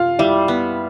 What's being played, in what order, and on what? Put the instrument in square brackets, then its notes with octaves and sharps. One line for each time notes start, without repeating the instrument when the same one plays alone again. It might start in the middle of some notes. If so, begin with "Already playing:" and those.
Already playing: [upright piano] F4 F5
[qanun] G3 [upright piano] E4 E5
[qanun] B3